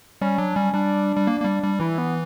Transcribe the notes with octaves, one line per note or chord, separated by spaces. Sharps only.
G3 C#4
F#3 D4
G3 C#4
G3 D4
G3
A#3
A#3
G3
G3
E3 E4
B3